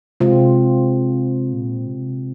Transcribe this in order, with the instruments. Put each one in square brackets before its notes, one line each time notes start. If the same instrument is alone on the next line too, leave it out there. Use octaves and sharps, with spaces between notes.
[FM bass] C3 [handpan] G#3 C4 F4
[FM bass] A#2
C3